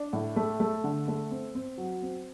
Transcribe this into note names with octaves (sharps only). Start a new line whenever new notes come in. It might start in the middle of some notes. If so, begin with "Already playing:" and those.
Already playing: D4
A2
A3
A3
D3
A3
C4
C4
F#3
C4